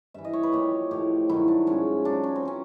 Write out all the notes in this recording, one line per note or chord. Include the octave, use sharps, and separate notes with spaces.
G2 E3 E5
D#5
C#5
B4
A#2 F3 G4
A2 F3 G4
G2 D#3 F#3 E4
D4
G#2 F3 C#4
B2 F#3 D4
C#4
C4
B2 F#3 C#4